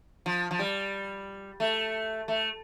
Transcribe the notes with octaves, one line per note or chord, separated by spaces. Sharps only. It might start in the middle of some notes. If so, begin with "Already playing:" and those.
F3
F3
G3
A3
A3